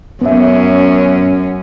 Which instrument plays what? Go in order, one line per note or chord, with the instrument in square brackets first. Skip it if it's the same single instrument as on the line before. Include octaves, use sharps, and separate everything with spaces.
[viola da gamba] F#2 C#4 [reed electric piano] B3 E5